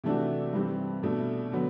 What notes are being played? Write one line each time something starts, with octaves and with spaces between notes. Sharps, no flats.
C3 E3 A3 D4 F#4
G2 E3 G3 C4
B2 A3 D4
D3 F#3 B3